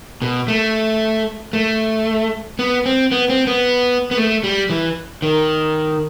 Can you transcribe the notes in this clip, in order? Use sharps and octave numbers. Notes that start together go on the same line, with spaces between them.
B2
A3
A3
B3
C4
B3
C4
B3
B3
A3
G3
E3
D#3